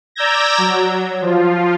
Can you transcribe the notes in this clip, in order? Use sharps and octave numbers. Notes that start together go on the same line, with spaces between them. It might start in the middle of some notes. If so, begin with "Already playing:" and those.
D5 A#5 E6 G6 G#6 A#6
F#3
F3 F4